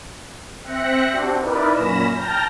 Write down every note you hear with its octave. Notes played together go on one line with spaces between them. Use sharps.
C4 E5 G5 F#6 A#6 C#7
C4 D4 F#4 G4
D#4 E4 A#4 B4 D5
F#2 A#2 C#4 B5 A#6 E7
G5 A5 A#5 F6 G6 A#6